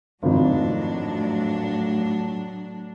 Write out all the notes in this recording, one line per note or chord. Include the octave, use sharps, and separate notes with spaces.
G#1 F2 A2 F#3 D4